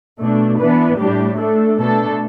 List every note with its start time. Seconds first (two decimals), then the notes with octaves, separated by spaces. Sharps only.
0.19 B2 A3 D4
0.58 E3 B3 D4 B4
0.97 A2 G3 D4 G4
1.37 A3 D4 A4
1.77 B2 A3 D4 A4